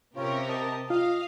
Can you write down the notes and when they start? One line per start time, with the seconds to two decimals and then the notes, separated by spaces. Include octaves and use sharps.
0.16 C3 C#4 F4 G4 A#4
0.49 D#5 A5
0.90 F4 D#5 F5